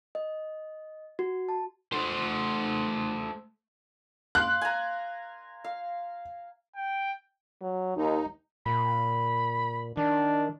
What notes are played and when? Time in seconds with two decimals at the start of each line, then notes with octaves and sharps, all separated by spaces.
0.15 D#5
1.19 F#4
1.49 A5
1.93 A3 C5
4.35 F5 C6 D6 F#6
4.61 G#5 A#5
5.64 F5
6.75 G5
7.62 F#3
7.97 D#2 D#4
8.66 A#2 B5
9.97 D#3 D4